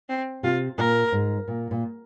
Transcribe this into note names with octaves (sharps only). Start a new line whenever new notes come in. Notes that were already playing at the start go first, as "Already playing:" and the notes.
C4
C3 F4
A#2 A#4
G#2
A#2
A#2